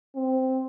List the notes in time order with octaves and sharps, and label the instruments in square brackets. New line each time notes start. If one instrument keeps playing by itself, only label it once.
[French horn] C4